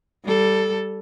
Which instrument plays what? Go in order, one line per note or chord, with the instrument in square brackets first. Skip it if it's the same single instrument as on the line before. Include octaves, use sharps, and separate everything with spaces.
[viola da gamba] G3 A4